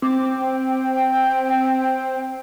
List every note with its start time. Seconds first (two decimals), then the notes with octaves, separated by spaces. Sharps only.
0.02 C4 D6
0.39 G5